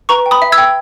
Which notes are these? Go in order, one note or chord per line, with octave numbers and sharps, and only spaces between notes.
B4 A#5 C#6
G5
B5 D#6
E5
E6 G#6
G5